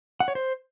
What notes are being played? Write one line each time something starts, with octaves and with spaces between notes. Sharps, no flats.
F#5
C#5
C5